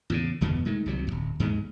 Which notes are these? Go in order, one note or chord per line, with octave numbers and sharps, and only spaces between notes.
E2 A2 C#3
G1 E2 B2 B3
D#3 G#3 A3
C2 C3 F#3
D1 D#2
D#2 G#2 G#3